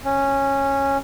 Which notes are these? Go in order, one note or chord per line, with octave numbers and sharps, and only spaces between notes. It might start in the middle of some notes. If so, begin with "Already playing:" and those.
C#4